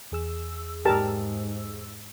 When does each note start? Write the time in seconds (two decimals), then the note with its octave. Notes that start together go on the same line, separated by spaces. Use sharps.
0.12 E2 G#4 E6
0.85 G#2 G4 A#4 A5